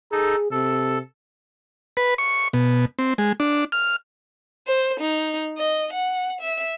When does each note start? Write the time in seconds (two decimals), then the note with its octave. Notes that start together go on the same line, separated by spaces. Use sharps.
0.12 D#4 G#4 A4
0.51 C3 A4
1.97 B4
2.18 C#6
2.53 B2
2.99 C4
3.18 G#3
3.40 D4
3.72 F6
4.67 C5
5.00 D#4
5.58 D#5
5.93 F#5
6.41 E5